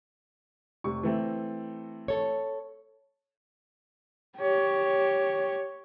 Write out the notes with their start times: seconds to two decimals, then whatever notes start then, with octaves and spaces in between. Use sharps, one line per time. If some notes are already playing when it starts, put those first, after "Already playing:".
0.84 F1 C3 C#6
1.03 E3 A3 C4
2.08 A4 C#5
4.38 G4 C#5